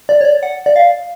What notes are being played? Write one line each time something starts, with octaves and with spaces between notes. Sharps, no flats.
D5
C#5
D5
F#5
D5
F5